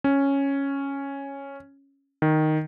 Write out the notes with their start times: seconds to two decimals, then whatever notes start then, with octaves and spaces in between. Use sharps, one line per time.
0.04 C#4
2.22 D#3